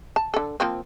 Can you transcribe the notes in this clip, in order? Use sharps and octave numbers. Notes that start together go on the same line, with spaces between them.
A5
D3 A4
F3 A#3 C4